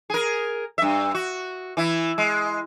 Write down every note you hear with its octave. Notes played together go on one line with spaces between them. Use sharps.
G#4 A#4
G2 E5
F#4
E3 E4
G#3